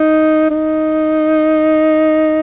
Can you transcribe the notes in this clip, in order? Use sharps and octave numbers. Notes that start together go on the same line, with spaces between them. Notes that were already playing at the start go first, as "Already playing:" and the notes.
Already playing: D#4
D#4